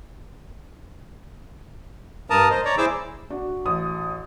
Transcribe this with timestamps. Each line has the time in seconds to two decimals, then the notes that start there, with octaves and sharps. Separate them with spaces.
2.30 G2 A#4 A5 A#5 D#6
2.50 C5 D#5
2.65 C#5 D5 A#5
2.78 E4 G#4 C5 D6 E6
3.30 D4 F#4
3.65 A1 D#6